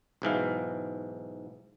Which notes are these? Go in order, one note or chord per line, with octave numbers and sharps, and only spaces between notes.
B1 G#2 E3 F5